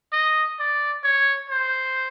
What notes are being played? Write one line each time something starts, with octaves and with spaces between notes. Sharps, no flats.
D#5
D5
C#5
C5